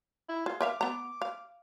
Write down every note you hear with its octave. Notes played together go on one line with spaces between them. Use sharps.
E4
F4 G#4
A#4 E5 F5 D6
B3 A#5
F5